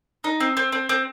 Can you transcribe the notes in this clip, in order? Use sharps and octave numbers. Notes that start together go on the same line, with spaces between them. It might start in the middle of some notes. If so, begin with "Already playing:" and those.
D#4
C4
C4
C4
C4